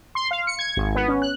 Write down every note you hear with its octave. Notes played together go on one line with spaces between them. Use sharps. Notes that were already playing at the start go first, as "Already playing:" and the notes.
C6
F5
C#7
G#6
G#1
B3
C#4
F#6